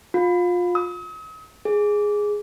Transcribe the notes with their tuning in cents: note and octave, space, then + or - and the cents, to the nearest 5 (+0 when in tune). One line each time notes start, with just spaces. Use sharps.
F4 +25
D#6 +45
G#4 +0